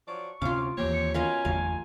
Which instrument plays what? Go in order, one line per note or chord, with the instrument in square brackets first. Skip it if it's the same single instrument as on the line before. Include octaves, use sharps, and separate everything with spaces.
[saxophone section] F3 F#3 D5 [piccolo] C#6
[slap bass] D2 C3 C#4 [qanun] F4 D6 [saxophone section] F5
[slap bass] D#2 E3 A#3 [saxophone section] C4 G4 C#5
[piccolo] C#7
[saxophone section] B2 D#3 C#4 [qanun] F4 A#4 F5 [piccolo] G#5
[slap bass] G1 E2 A3 [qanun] F5